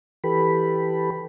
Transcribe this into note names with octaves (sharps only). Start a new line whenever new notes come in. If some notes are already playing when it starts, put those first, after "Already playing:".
E3 G4 A4 B4 B5